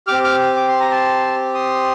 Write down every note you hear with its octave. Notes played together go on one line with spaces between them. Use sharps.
C4 G4 D6 F6
D6 F6
D6
C6
A#5
A5 C6
C6 D#6